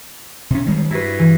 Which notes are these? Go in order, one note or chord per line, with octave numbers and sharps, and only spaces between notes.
C3 C#4
D#3 G3 G#3
G2 E4 F#4 B4
E3